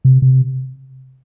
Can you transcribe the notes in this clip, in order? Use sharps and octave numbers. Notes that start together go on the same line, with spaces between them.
C3
C3